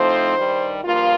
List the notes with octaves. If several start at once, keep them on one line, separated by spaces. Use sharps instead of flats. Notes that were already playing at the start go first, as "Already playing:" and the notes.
Already playing: A2 F3 A3 C4 D#4 C5
G2 D#3 G3
G2 F3 A#3 F4